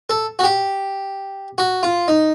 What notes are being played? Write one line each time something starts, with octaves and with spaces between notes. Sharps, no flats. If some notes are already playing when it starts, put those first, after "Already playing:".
A4
F#4
G4
F#4
F4
D#4